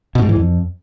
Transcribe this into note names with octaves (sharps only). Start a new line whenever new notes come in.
B2
G#2
E3
F2